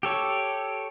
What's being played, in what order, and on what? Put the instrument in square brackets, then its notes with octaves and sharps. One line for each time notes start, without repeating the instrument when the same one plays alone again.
[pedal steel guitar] G4 A4 C#5